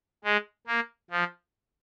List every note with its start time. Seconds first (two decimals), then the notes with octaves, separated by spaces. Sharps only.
0.24 G#3
0.67 A#3
1.11 F3